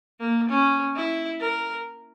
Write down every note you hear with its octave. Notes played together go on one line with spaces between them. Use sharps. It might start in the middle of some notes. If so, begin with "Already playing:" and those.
A#3
C#4
E4
A#4